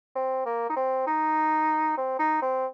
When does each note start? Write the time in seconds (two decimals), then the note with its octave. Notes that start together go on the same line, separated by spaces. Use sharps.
0.16 C4
0.46 A#3
0.70 D#4
0.76 C4
1.07 D#4
1.97 C4
2.19 D#4
2.42 C4